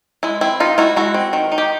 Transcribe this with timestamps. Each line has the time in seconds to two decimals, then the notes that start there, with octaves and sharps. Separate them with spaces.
0.23 G#3 E4
0.41 C4 E4
0.60 D#3 D#4 F4
0.78 D#4 E4 F#4
0.96 G#3 E4 F#4
1.14 C4
1.33 D#3
1.52 D#4
1.58 G4